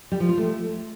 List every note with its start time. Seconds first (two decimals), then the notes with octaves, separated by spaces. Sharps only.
0.12 G3
0.20 F3
0.29 F4
0.37 A3